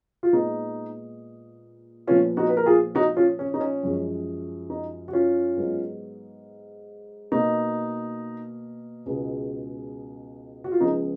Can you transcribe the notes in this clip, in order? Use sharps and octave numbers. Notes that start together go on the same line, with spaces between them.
F4
A#2 G#3 B3 D#4
A#2 F3 B3 C#4 F4
D#4 F#4
B4
A#4
F4 G#4
D#4 F#4
C#4 F4
C#4
D#4
C#4
F#2 F3 G#3
D#4
F#4
C#4 F4
G#2 F#3 B3
B2 A#3 D#4
C#2 B2 G#3 B3
F#4
F4
C#2 C#3 F3 G#3 B3 D#4